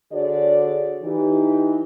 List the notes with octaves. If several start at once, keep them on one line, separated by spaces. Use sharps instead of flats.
D3 F#4 G#4 C#5 D5
E3 D#4 G4